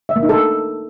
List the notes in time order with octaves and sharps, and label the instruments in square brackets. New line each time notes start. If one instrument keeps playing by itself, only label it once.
[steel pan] E5
A#3
D#4
A4